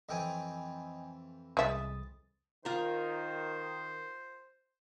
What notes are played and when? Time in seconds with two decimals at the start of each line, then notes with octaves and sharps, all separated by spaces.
0.09 F2 E3 C4 D#5 G5 G#5
1.57 C2 G#3 E5 D#6 A6
2.65 D#3 F4 A#4 C5